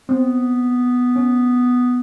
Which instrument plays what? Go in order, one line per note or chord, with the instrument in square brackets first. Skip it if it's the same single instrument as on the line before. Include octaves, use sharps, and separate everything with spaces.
[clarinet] B3 [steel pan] C4
[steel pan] C#4